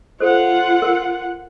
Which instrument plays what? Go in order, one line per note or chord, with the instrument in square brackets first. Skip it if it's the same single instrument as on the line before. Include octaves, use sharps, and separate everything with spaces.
[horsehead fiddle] F4 F#5 [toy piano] A4 C5
[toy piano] A#4